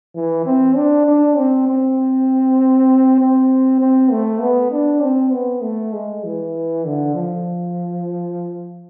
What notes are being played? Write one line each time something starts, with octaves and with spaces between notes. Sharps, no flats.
E3
C4
D4
D4
C4
C4
C4
C4
A3
B3
D4
C4
B3
A3
G#3
E3
D3
F3